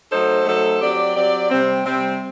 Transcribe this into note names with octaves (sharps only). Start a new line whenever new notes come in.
F#3 A3 D#4 A4 C5
F#3 A3 D#4 A4 C5
F#3 C4 G4 D5
F#3 C4 G4 D5
C3 G3 C4
C3 G3 C4